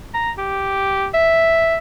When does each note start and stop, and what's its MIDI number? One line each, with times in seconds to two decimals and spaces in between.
0.14 0.31 82
0.38 1.07 67
1.14 1.78 76